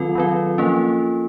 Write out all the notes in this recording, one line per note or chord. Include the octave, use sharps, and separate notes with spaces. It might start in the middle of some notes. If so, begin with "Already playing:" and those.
Already playing: D#3 F#3 C4 F4 A4
D#3 F#3 C4
F3 A#3 C#4